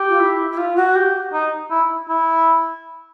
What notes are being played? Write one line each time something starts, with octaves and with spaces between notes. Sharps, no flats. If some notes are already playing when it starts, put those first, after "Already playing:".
Already playing: G4
F4
E4
E4
F4
F#4
G4
D#4
E4
E4